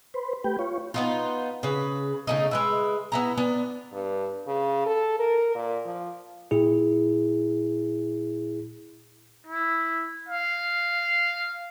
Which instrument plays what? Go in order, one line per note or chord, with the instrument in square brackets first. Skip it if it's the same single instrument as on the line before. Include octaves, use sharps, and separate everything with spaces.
[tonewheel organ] B4 C5
A3 G4 B4 G5
F4 C#5
[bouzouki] B3 D#4 F4
C#3 B4
C#3 A3 D#4
G#3 B4 E5
B3 E4 A#5
B3 D4
[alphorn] G2
C#3
A4
A#4
A#2
F3
[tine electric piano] A#2 E4 G#4
[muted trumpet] E4
F5